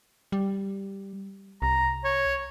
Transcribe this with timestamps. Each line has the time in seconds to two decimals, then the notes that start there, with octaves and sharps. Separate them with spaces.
0.32 G3
1.62 C2 A#5
2.04 C#5